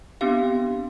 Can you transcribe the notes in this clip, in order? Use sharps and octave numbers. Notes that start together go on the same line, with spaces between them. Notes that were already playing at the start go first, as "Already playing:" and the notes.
B3 C4 D4 G4 F5